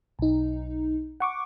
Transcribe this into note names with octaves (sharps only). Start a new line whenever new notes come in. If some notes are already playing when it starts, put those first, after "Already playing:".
B1 D#4
F#5 C#6 D6